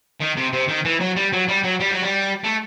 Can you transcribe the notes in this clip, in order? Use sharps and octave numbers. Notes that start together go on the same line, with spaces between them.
D#3
C3
C3
D#3
E3
F#3
G3
F#3
G3
F#3
G3
F#3
G3
A3